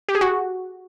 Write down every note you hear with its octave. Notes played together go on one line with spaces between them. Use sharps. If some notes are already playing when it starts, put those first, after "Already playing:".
G4
G#4
F#4